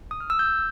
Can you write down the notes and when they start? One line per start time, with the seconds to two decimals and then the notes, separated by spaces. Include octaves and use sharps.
0.11 D#6
0.20 F6
0.30 E6
0.39 G6